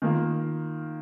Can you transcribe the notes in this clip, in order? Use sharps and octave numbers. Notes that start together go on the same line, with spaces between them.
D#3 A#3 F4